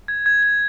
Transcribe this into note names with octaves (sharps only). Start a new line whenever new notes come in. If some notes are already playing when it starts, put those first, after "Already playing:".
G#6
G#6
G#6